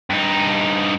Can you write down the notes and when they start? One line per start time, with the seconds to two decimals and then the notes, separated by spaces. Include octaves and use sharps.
0.10 G2 D#4